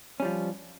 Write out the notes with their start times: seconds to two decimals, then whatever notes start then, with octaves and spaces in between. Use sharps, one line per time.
0.20 C#4
0.22 G3
0.25 F3